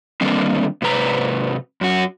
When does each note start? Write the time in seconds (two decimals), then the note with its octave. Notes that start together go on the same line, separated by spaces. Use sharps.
0.21 D3 D#3 G3 A#3 C4
0.82 G#2 C3 B4 A#5
1.81 F#2 F#4